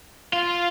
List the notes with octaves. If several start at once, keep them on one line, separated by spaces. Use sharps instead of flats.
F4